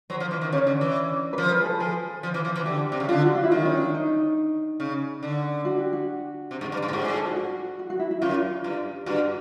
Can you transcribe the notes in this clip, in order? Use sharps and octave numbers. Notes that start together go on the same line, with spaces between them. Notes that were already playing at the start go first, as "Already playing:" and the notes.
F#3 C5
F3
E3
D#3
C#3 C#4 C#5
D3
E3
B4
F3 C5
B4
G#4
A4
F3 G#4
F3
E3
F3
E3
D3 G4
C3
C#3
D3 F4
F#4
F4
E4
D#3 D#4
C#4
D4
D#4
C#3
D3
F#4
G4
F#4
C3
G#2
G2
G2
A2
G#2 G4
G#4
A4
F#4
F#4
F#4
F#4
E4
E4
F#2 F4
G2
G2 F#4